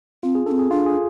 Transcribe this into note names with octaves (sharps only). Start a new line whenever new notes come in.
C4 F4
G#4
D4 A4
C4
G#4
D4 F4
G#4